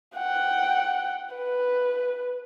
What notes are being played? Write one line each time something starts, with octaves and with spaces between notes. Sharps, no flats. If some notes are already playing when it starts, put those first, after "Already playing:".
F#5 G5
B4